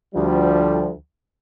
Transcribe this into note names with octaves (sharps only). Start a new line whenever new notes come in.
D2 F3 G3